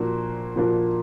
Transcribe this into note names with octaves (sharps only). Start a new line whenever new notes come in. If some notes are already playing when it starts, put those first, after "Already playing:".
Already playing: A#2 F3 A#3 D4 F#4
A#2 F3 A#3 D4 F#4